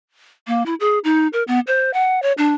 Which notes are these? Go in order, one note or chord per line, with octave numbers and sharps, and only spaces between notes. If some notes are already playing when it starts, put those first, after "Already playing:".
A#3
E4
G#4
D#4
A#4
B3
C5
F#5
C#5
D4